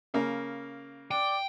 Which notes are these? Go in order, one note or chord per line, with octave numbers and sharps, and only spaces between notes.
C#3 A#3
D5 G5